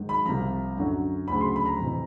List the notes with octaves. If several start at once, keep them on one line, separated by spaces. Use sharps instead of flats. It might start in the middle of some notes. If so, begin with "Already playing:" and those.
Already playing: G#2 D#3 F#3
B5
C2 C3 F3 A#5
F#2 D3 F#3
D2 C#3 F#3 B5
C6
B5
A#5
F2 C3 E3